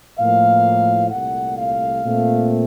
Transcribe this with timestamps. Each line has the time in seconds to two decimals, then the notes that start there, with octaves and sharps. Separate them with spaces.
0.19 A2 F3 A#3 F5
1.11 C2 A#2 A3 F#5
1.57 F5
2.04 A#2 A3 C4